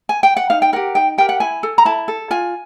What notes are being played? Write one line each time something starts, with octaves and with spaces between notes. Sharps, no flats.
G#5
G5
F#5
D#4 F5
G5
G4 A#4 F#5
D#4 G5
G4 A#4 G5
F#5
E4 G#5
A4
A#5
E4 A5
A4
F4 G#5